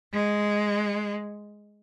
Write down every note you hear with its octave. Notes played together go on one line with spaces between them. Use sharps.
G#3